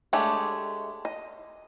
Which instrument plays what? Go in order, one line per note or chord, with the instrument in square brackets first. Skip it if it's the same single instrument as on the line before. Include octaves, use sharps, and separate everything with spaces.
[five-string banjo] G#3 A3 D4 G4 C#5
D#5